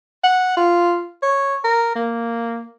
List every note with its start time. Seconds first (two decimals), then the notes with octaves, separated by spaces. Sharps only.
0.24 F#5
0.57 F4
1.23 C#5
1.64 A#4
1.96 A#3